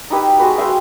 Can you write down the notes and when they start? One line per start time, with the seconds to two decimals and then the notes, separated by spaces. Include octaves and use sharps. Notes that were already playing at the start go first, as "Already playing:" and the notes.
0.10 D#4 E4 G4 B4
0.39 G#3 F#4 B4
0.58 E5 F5 G5 C6